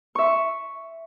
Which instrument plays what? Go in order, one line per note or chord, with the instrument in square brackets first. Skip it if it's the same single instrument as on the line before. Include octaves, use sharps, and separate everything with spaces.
[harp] E5 C#6